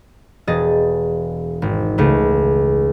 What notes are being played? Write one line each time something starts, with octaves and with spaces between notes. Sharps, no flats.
E1 G#4 D#5 A6
G#1
C#2 A3